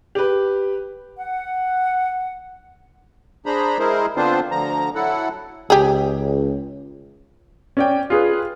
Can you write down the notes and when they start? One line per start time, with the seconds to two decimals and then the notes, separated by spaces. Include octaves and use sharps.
0.15 G4 B4
1.18 F#5
3.46 D4 G#4 C5 A#5 B5
3.79 G#3 E4 G#4 A#4 C5
4.16 D3 B3 C4 D4 F4 C5
4.51 D2 D3 F3 A#5
4.95 F#3 E4 A4 F#5
5.70 C#2 G4 G#4
7.77 C#4 D5 G5
8.10 F4 G#4 B4